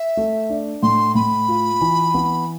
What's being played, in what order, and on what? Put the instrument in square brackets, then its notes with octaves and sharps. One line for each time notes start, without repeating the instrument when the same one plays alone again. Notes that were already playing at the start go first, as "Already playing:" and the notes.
Already playing: [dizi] E5
[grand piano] A3
D4
[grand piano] A2 [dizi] C6
[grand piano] A2 [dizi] B5
[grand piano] F4
E3
B3